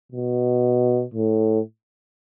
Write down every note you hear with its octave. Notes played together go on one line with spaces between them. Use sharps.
B2
A2